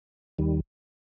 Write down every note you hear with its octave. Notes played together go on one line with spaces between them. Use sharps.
D#2 D#3 G3